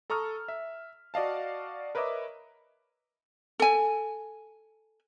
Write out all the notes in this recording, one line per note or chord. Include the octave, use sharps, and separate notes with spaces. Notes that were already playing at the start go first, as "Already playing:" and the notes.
A4 A#5 C#6 D#6 F6
E5
F#4 D5 D#5 F5 A5
A#4 B4 C#5 D#5 E5 D6
A4 G#5